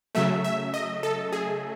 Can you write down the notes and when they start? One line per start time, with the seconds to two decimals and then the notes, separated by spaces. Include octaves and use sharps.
0.15 C#3 F#3 A3 E5
0.44 E5
0.74 D#5
1.03 A4
1.33 G#4